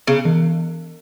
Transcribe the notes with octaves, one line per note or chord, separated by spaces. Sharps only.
C#3 B3
E3